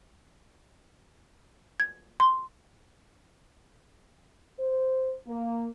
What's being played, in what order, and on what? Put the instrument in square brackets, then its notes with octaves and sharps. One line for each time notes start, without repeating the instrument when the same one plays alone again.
[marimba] G#6
C6
[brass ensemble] C5
A#3